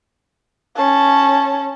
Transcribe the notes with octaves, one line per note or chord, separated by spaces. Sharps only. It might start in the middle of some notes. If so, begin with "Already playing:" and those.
C#4 A5